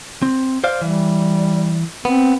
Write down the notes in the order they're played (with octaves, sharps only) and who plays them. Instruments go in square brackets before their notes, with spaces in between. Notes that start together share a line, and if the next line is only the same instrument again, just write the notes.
[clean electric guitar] C4
C5 D5 F5
[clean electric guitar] E3 [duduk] G3
[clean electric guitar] B3 [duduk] C4